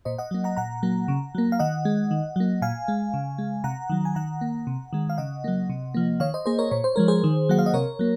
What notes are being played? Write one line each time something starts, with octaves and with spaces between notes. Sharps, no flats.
A#2 C5 D#5
D#5 F#5
F#3 A#3
F#5 A#5
A#2 F#5 A#5
F#3 A#3
C#3
F#3 A#3
F5
D#3 D#5 F#5
G#3
D#3
F#3 A#3
A#2 F5 G#5
G#3
C#3
G#3
C3 F#5 A#5
D#3 F#3
G#5
D#3 F#5 A#5
A#3
C3
D#3 G#3
F5
C#3 D#5 F#5
F#3 A#3
C3
F3 A#3
D#3 C#5 F5
C5 D#5
A#3 G#4 C5
A#4 C#5
A#2 C#5
C5
F3 G#3 A#4
G#4 C5
D#3
F#3 A#3 F#5
F5
D#5
C3 A#4 C#5
F#3 A#3